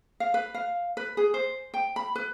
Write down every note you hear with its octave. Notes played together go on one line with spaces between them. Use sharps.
F5
B4
F5
B4
G#4
C5
G5
B5
B4